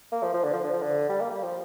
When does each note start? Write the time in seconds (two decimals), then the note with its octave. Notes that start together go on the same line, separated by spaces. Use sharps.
0.12 A#3
0.23 F3
0.34 F3
0.44 D3
0.54 F3
0.64 D3
0.73 F3
0.82 D3
1.09 G3
1.21 A#3
1.31 G3
1.42 F3